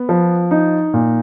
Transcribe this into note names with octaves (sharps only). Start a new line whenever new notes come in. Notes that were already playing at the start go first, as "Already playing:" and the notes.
Already playing: B3
F3
D#4
A#2